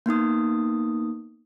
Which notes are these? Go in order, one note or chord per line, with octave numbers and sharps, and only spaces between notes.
A#3 B3 D#4 D#6